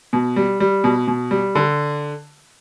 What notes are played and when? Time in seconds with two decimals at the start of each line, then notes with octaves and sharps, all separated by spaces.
0.13 B2
0.36 G3
0.60 G3
0.84 B2
1.08 B2
1.31 G3
1.55 D3